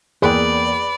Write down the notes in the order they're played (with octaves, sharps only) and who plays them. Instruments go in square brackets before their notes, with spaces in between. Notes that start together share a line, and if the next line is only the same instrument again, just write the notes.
[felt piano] E2 A#3 G5 [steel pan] G#4 [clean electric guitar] B4 [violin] D5